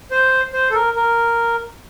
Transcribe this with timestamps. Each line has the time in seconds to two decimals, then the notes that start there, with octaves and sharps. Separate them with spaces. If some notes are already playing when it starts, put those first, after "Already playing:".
0.11 C5
0.53 C5
0.70 A4
0.74 A#4
0.96 A#4